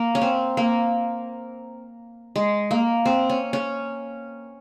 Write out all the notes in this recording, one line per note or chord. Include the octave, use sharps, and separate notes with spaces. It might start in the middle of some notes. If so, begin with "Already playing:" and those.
Already playing: A#3
C#4
C4
A#3
G#3
A#3
C4
C#4
C#4